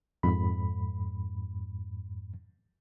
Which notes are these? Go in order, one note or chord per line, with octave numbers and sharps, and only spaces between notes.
F2 G#2 B5